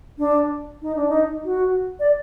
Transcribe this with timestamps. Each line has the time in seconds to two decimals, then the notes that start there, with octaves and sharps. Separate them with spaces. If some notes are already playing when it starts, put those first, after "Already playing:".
0.19 D4
0.82 D#4
0.96 D4
1.09 D#4
1.45 F#4
2.00 D5